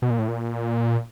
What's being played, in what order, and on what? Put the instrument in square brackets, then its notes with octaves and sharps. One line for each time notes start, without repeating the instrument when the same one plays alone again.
[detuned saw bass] B2
A#2
A2
A#2